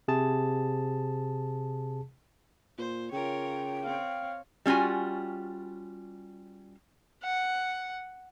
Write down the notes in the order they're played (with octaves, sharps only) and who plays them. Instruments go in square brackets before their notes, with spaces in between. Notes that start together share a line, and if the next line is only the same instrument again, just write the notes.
[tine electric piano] C3 G#4 A5
[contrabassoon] A#2 [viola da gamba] C5
[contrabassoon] C#3 [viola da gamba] F4 A#4 C#5 [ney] G5
[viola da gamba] C4 C#5 [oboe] F5
[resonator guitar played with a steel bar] G3 C#4 F4 F#4 G#5
[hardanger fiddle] F#5